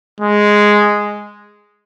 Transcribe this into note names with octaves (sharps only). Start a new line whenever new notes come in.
G#3